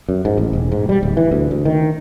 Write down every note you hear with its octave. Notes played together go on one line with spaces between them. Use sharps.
F#2
G#2
A1
E1
G#2
G3
D1
E3
D2
D2
D#3